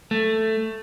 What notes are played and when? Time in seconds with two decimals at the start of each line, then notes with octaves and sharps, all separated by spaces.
0.11 A3